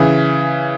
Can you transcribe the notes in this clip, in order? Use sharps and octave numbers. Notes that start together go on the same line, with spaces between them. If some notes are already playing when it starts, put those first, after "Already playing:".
Already playing: C#3 E3